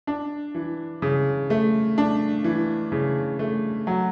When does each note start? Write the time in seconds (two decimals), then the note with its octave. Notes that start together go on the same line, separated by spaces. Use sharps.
0.07 D4
0.55 E3
1.02 C#3
1.50 A3
1.98 D4
2.44 E3
2.92 C#3
3.39 A3
3.87 F#3